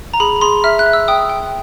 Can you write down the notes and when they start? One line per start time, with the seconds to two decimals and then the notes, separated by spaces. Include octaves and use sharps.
0.14 A#5
0.20 G#4 B5
0.41 G#4 C6
0.64 E5 F6
0.79 F#6
0.86 E5
0.93 E6
1.08 G5 D#6
1.29 G5